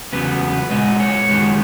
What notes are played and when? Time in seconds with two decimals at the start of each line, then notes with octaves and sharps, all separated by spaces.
0.13 E2 C#3 F#3 B3 B4
0.70 A#2 G#3 B3 D#5
1.00 C#5
1.29 F#2 D#3 G#3 B3